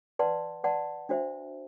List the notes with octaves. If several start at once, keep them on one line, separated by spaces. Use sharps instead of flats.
B4 D5 F#5 A5 C6
B4 D5 F#5 A5 C6
D4 F#4 C5 E5